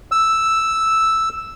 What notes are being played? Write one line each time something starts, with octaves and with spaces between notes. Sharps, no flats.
E6